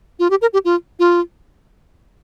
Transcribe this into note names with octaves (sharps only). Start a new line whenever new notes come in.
F4
G4
A#4
G4
F4
F4